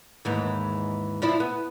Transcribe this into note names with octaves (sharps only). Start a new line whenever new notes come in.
D#2 G#2 E3
F3 D4 E4
B3